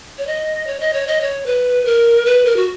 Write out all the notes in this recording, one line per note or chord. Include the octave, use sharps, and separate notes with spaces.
C#5
D#5
C#5
D#5
C#5
D#5
C#5
B4
A#4
B4
A#4
F#4